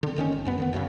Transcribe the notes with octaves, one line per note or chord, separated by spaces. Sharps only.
D3 C4
F#1 D#3 C4 C#4
G1
F#1 F#2 B3
D#3 F3 B3
F#1 F#2 A2 C#3